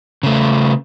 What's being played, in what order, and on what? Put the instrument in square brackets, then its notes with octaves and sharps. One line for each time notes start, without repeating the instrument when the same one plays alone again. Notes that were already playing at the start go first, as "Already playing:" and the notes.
[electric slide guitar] C#3 A3